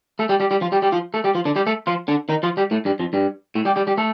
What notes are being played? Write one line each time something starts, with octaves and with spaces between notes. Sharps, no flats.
A3 A4
G3 G4
G3 G4
G3 G4
F3 F4
G3 G4
G3 G4
F3 F4
A3 A4
G3 G4
F3 F4
D3 D4
G3 G4
A3 A4
F3 F4
D3 D4
D#3 D#4
F3 F4
G3 G4
A2 A3
G2 G3
F2 F3
G2 G3
A2 A3
G3 G4
G3 G4
G3 G4
A3 A4